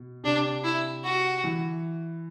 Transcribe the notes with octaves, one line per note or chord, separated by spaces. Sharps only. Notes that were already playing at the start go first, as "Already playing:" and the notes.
Already playing: B2
C3 D4
E4
F#4
E3